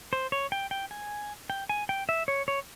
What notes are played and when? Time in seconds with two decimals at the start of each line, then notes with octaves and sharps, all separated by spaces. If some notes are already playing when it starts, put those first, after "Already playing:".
0.13 C5
0.32 C#5
0.52 G5
0.71 G5
0.91 G#5
1.50 G5
1.69 G#5
1.89 G5
2.09 E5
2.28 C#5
2.48 C#5